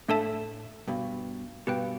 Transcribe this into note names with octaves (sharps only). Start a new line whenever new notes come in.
A2 A3 D4 A4 E5 A5
G2 B2
G2 B2 G4 B4 G5